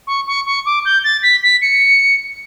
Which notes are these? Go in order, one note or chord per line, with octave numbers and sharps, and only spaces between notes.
C#6
C#6
C#6
D6
G6
A6
B6
B6
C#7